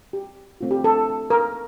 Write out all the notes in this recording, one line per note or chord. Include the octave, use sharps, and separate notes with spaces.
G4
A3 C4 F4
G4
A4
A#4